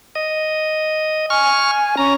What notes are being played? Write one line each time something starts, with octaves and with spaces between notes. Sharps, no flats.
D#5
G#5 C#6 F6
C#4 A#5